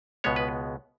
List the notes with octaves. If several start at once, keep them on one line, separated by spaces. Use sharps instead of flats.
C#2 B2 G#3 B3 C#5
B4